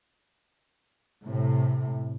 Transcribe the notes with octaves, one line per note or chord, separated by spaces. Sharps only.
A2 C3